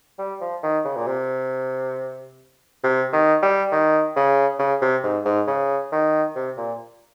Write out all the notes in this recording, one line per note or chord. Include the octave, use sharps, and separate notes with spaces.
G3
F3
D#3
C#3
A#2
C3
C3
D#3
G3
D#3
C#3
C#3
C3
G#2
G#2
C#3
D#3
C3
A#2